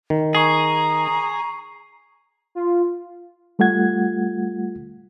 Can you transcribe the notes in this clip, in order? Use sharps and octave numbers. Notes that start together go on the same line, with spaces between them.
D#3
G#4 A#5 C#6 C7
F4
G3 A3 F4 F#5 G#6